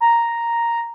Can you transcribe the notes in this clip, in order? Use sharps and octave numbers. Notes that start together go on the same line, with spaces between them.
A#5